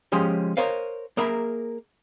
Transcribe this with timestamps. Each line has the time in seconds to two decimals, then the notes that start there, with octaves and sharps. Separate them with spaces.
0.12 F3 G#3 C#4 G4
0.57 A#4 C5 C#5 D#5 F5
1.17 A#3 G#4 A#4 E5 B5